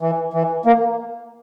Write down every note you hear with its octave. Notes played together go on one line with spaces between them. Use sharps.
E3
E3
A#3